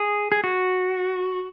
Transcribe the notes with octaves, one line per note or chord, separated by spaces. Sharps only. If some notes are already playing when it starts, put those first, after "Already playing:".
Already playing: G#4
G#4
F#4